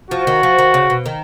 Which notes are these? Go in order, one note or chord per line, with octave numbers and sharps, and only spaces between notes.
F3 F#4
D#3
F3
D#3
C#3
B2
D#3